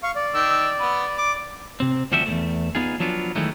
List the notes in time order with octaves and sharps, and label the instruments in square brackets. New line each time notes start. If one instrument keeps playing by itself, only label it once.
[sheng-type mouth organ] F5 C#6
D5
[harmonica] D#3 E6
B3 B4
D6
[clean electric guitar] C3 C4
D2 F3 G3 F#4 G4 E5
E2 G#2 A3
B3 D#4 F4 G#4
F3 F#3 B3 D4 F4
D#3 E3 F#3 G#3 A3